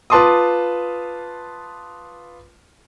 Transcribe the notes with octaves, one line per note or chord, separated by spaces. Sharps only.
F4 B4 A5 C6 D6 D#6